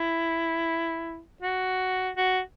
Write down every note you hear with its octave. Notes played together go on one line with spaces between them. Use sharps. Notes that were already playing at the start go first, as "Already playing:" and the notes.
Already playing: E4
F#4
F#4